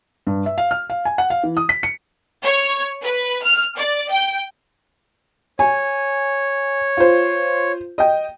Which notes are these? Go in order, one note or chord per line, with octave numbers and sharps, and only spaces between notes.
G2
E5
F5
F6
F5
G#5
F#5
F5
E3
D#6
B6
C#7
C#5
B4
F6
D5
G5
C#5 G#5
F4 C5
D#5 G5